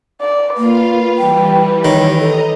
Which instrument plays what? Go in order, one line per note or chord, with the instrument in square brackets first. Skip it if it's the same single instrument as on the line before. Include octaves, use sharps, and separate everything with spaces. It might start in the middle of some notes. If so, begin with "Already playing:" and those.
[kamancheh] D5
[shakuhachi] A#3 [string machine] F4 F5 [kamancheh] B4
[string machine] E3 G3 [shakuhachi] G5
[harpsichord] D#3 [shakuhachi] C#5
[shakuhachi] A4 [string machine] D#5 A#5